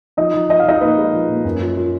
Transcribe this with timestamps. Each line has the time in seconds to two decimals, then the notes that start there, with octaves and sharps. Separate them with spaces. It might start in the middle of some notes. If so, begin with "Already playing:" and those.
0.17 F3 D#4 D#5
0.34 F3
0.49 F3 D#5
0.60 F5
0.65 F3 D#4 D#5
0.81 A#2 B4
0.98 G#3
1.13 F3
1.28 A#2
1.45 F#2
1.61 F4
1.77 F4